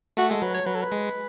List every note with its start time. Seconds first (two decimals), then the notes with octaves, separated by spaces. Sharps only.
0.17 A3 F#4
0.30 G#3 A4
0.42 F#3 B4
0.54 C#5
0.66 F#3 B4
0.74 A4
0.82 B4
0.92 G#3